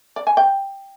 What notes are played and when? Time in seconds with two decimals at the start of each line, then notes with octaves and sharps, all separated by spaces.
0.16 D5
0.27 G#5
0.37 G5